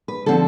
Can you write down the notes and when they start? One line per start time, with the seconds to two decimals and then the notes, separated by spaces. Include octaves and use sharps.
0.08 B4
0.26 D3 F3 C4 A4